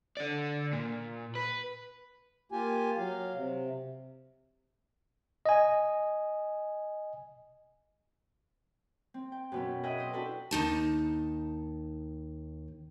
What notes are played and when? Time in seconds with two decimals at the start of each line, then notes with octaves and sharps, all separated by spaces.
0.17 D3 D5
0.73 A#2
1.35 B4
2.52 A#3 F4 G4 G#5
2.98 F#3 F5
3.35 C3
5.46 D#5 G#5
9.14 C4
9.32 G5
9.52 F#2 B2 B3
9.83 G#4 B4 D#5 E5 G5
9.98 C5 D#6
10.13 D4 E4 F#4 A4 B4 A5
10.51 D#2 D#4 A5